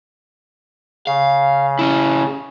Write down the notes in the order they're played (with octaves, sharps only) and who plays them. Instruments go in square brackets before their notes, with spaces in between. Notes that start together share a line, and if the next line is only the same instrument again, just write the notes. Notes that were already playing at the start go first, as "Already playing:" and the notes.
[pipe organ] C#3 [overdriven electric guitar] F5
[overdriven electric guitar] C#4 E4